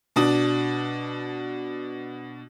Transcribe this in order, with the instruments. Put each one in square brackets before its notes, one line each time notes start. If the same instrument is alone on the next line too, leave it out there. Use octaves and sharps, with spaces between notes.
[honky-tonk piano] B2 D4 D#6